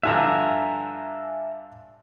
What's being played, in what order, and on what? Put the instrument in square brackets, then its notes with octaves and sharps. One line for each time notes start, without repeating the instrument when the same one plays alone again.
[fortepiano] G2 D3 F3 [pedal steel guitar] E5 G#5 A#5